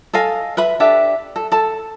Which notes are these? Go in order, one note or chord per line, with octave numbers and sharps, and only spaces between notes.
A4 D#5 F5 G#5
B4 E5 B5
D4 G4 A4 E5
A4
A4 A5